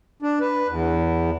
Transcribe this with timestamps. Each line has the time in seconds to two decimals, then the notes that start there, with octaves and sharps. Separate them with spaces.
0.22 D4
0.41 B4
0.68 E2